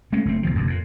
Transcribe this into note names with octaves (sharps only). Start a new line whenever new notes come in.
G#3 A3 C#4
F#1 A3 C4
B1 D#3 F3
F1 D2 G2
F2 A#2